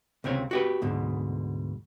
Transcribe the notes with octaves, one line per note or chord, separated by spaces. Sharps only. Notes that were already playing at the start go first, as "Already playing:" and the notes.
C#2 C3 C4 C#5
F#4 G4 B4
D2 G#2 B2